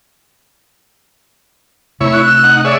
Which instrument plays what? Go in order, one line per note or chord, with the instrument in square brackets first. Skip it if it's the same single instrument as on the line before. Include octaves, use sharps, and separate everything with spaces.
[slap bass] C3 A3 [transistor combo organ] E4 C#5
[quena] F#6
[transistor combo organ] E6
D#4 F#5
[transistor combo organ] G#4 C#5 E5 [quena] D5